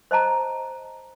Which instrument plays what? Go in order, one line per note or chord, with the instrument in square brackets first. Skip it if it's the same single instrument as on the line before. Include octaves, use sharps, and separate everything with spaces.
[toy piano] C5 D#5 A5 A#5